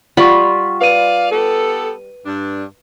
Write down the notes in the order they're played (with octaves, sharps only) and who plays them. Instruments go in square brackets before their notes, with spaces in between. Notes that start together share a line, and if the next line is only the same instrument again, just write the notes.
[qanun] G3 F4 B5 [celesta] F#5 C#6
[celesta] B4 D#7 [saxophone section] D5 F5
[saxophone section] B3 G4 A4
G2 D4